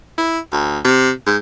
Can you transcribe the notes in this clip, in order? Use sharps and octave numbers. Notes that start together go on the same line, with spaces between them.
E4
D2
C3
G#2